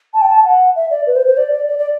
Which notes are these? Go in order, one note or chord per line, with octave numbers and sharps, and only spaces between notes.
A5
G5
A5
F#5
E5
D5
B4
C5
C5
D5
D5
D5
D5